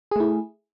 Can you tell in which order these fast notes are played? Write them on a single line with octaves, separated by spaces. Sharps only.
G#4 A3 E4